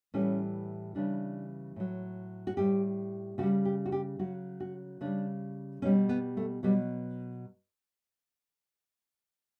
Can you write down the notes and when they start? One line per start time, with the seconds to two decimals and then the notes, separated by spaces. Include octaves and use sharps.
0.14 A2 E3 G3 C#4
0.95 C#3 E3 G3 D4
1.76 A2 F#3
2.47 F#4
2.57 A2 G3 G4
3.38 C#3 F#4
3.43 G3
3.65 G4
3.86 F#4
3.92 G4
4.19 C#3 F#3 F#4
4.60 F#4
5.01 C#3 G3 D4
5.82 B2 G3 C#4
6.09 B3
6.37 A3
6.63 B2 F#3 G3